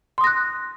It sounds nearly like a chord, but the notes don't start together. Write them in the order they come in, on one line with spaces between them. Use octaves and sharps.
C6 D#6 A#6 F#6